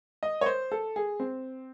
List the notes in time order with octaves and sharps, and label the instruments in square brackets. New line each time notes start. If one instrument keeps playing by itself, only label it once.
[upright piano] D#5
C#5
C5
A4
G#4
C4